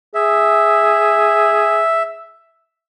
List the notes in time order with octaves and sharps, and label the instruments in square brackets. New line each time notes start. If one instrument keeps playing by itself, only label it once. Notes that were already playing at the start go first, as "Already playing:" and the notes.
[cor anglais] G#4 [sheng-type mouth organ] E5